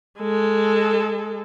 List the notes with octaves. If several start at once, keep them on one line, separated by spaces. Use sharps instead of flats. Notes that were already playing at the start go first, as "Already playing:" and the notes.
G#3 A4